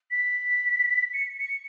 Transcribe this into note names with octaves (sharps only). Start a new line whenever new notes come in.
B6
C#7
C#7